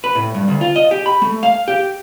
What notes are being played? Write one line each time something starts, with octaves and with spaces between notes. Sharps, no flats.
B4
A2
G2
D2
F4
D#5
G4
B5
A3
F5
G4